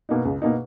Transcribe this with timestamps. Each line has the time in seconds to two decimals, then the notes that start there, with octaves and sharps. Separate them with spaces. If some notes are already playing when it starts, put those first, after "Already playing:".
0.09 B2 A#3 D#4
0.25 C#2
0.42 B2 A#3 D#4